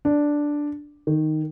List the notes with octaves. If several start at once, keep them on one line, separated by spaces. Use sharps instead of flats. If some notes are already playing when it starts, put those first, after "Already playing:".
D4
D#3